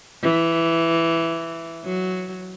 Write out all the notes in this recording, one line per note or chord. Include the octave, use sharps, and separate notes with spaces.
E3
F#3